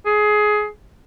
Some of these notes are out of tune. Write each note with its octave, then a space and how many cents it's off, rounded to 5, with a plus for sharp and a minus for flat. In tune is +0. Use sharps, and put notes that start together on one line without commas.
G#4 +20